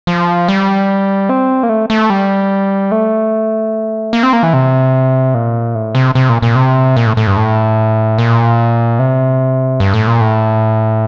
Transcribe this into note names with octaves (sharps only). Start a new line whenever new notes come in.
F3
G3
C4
A#3
A3
A3
G3
A3
A#3
C4
A#3
E3
C3
A#2
A2
C3
C3
A#2
A#2
C3
A#2
A2
A2
G2
A2
A#2
C3
G2
A2
A#2
A2